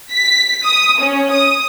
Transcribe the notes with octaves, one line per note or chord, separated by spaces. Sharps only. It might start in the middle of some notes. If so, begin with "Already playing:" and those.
B6
D#6
C#4
D#6